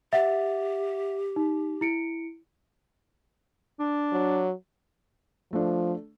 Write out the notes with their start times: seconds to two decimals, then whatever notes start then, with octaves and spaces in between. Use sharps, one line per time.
0.13 G4 E5 F#5 A6
1.36 D#4
1.81 E4 C#7 D7
3.80 D4
4.12 F#3
5.53 F3 A3 D4